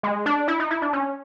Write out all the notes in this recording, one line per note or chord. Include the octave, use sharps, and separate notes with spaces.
G#3
D4
E4
D#4
E4
D4
C#4